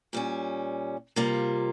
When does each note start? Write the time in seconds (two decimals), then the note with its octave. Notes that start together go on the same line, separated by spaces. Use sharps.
0.13 A#2 G3 C#4
1.16 C3 G3 A#3 F4